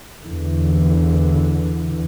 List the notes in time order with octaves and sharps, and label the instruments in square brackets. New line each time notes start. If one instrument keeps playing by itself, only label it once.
[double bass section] E2 D3 E3